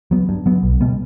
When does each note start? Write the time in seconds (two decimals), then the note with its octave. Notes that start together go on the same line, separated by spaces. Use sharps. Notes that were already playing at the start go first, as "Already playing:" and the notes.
0.11 F#3 B3
0.29 G2
0.46 F#3 B3
0.63 B1
0.81 B2 G3 B3